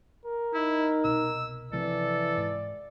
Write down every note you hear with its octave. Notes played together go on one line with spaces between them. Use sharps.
A#4
D#4 E4
C2 B2 E6
C3 E3 F3 D4 A4 D5
G#2